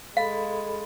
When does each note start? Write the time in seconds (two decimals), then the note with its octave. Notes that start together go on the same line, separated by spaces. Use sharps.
0.17 G#3 A4 F5 B5